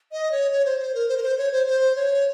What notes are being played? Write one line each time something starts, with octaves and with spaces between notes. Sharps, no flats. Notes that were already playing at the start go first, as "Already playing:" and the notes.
D#5
C#5
C#5
C5
C5
A#4
C5
A#4
C5
C#5
C5
C5
C#5